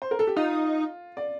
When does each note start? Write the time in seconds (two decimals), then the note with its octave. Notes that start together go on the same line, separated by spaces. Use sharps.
0.02 C5
0.11 A#4
0.19 A4
0.27 G4
0.36 D#4 F4
1.17 D5